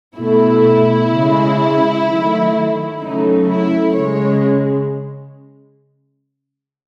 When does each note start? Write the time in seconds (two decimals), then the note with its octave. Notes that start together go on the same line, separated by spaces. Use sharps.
0.17 B2 A3 E4
1.12 C#3 G#3
2.06 D#3 F#3 A3
3.01 C#3 F#3 A3 D#4
3.49 E4
3.96 C#3 G#3 C#5